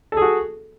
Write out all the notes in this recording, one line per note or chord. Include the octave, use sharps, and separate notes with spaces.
F#4 G#4 A4